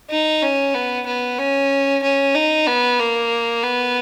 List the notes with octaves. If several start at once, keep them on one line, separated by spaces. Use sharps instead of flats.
D#4
C#4
B3
B3
C#4
C#4
D#4
B3
A#3
B3